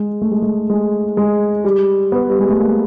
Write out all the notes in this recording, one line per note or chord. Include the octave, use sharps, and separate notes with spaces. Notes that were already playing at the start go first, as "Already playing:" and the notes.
Already playing: G#3
A3
G#3
A3
G#3
G#3
G3
B3
G3
G#3
A3
A#3